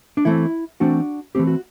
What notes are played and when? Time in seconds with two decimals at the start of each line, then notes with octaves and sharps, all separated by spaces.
0.17 D4
0.25 E3 A3 C4 E4
0.80 E3 A3 C4 D4 F#4
1.35 E3 A3 C4 G4
1.47 F#4